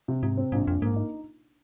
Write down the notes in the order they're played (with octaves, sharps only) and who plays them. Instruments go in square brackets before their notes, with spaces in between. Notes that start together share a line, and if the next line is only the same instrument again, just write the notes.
[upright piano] C3
[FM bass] G#2 [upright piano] C3
[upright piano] C4
[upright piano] A#1 [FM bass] G#2
[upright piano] A#1 [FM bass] F2
[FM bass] G#2 [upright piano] A#3
[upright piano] D#4